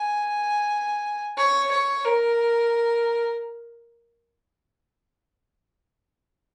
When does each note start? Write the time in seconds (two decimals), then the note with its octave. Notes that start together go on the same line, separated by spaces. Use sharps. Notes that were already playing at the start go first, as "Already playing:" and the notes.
Already playing: G#5
1.37 C#5
1.71 C#5
2.05 A#4